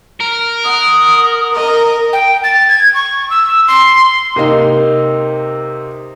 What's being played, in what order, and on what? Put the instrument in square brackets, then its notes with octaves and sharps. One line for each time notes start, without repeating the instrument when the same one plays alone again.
[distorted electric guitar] A#4
[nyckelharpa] F#5 [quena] D#6
[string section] A#4 [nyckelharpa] D#5
[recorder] G5
A6
G#6
C#6
E6
C6
[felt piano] C3 A#3 D#4